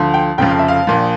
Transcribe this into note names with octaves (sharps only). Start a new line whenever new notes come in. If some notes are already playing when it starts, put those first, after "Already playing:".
Already playing: D2 D3 F3
G5
F1 F2 C#3 F3 G5
F5
E5
F5
A#1 A#2 F3